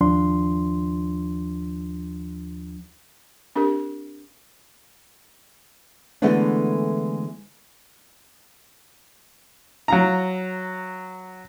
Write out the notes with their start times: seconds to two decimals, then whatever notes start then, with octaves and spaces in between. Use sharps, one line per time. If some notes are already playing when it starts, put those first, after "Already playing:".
0.01 D#2 F3 D4 F4 C6
3.56 C4 D4 G4 A#4
6.22 D3 E3 G#3 A3 B3 D4
9.88 F#3 F5 A#5